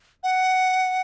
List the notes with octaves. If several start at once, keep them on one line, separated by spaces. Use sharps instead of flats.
F#5